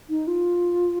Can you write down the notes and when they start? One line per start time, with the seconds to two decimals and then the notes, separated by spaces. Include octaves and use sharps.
0.10 D#4
0.27 F4